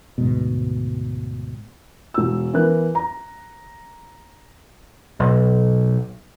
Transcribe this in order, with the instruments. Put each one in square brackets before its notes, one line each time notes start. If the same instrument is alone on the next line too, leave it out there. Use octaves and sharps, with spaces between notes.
[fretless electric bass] D2 G#2 B2
[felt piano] E1 E6
E3 B3 A#4 B4 F#6
A#5
[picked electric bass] B1